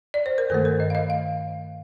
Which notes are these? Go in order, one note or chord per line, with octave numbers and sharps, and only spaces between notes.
D5
C5
A#4
G2 D#3 A3 A4
A#4
D#5
F5
D#5
F5